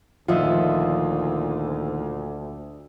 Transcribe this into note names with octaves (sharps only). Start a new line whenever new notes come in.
D2 A#2 D#3 F3 F4 D#5 E5 F#5